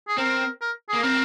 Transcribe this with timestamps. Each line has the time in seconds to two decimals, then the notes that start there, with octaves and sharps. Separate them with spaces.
0.08 G#4
0.18 C4 A#4
0.61 A#4
0.89 G#4
0.94 A#3
1.02 C4 A#4